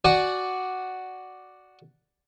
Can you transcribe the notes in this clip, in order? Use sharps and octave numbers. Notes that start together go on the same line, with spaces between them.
F#4 D5 F#5 G#5